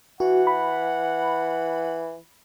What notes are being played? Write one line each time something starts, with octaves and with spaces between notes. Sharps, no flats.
E3 F#4 F#5
B5